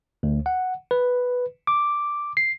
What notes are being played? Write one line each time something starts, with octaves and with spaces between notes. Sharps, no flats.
D2
F#5
B4
D6
C7